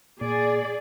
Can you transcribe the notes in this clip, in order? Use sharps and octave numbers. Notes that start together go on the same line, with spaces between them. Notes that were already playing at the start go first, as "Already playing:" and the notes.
A#2 G#4 D5